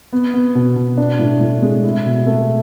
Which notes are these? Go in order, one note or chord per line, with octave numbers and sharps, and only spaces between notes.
B3
B3
B2
B2
D4
A2
A2
G#3
E4
B2
A3